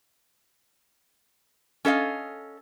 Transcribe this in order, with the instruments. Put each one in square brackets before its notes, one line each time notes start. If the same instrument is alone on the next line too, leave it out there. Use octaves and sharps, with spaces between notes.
[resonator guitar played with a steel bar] C#4 A4 D#5 F5